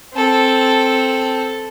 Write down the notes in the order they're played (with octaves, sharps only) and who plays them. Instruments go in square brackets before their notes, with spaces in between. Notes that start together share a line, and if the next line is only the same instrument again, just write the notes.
[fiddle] C4 A4